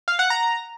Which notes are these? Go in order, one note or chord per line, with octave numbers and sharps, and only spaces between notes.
F5
F#5
A#5